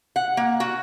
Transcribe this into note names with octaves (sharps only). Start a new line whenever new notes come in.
F#5
A#3
F#4